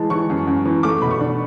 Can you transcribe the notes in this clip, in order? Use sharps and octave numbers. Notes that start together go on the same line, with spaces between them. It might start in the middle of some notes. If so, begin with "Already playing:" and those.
Already playing: E3 G#3 A5
E3 C#6
F#2
F#2
E3
A3 D6
B2 B5
C#6
D4